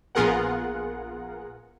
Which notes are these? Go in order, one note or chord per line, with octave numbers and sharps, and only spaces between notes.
A#1 B3 F4 G#4 A#4 F#5